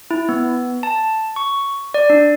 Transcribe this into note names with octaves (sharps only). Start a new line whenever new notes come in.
E4
B3
A5
C#6
D5
D4